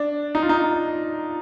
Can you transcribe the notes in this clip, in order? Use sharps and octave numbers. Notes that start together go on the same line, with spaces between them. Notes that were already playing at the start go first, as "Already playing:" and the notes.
Already playing: D4
D#4
F4
D#4